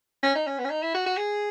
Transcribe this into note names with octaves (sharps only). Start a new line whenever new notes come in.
C#4
D#4
C#4
B3
C#4
D#4
E4
F#4
F#4
G#4